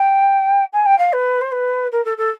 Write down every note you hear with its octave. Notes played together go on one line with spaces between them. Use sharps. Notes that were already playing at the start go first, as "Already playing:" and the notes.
Already playing: G5
G#5
G5
F5
B4
C5
B4
A#4
A4
A4